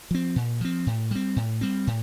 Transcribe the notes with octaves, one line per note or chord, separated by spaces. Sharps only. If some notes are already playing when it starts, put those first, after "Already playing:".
F3 C4
A#2
F3 C4
A2
G3 C4
A2
G3 C4
A2